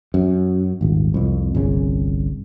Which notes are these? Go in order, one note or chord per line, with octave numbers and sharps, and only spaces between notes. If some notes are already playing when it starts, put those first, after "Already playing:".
F#2
D#1 G#1
C2 F2
G1 C2 C#3